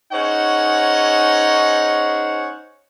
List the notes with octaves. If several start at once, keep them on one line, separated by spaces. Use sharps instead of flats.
C#4 D#4 G#4 C5 C#5 F#5